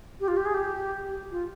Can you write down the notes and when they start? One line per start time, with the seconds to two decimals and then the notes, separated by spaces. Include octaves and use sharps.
0.20 G4
0.27 F4
0.36 G4
0.45 G#4
0.54 G4
1.31 F4